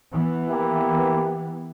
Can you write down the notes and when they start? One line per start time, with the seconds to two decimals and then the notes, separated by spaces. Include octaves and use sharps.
0.12 E3 B3
0.49 A#3 E4 G4